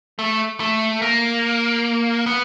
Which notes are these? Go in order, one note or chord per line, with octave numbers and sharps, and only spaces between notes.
A3
A3
A#3
B3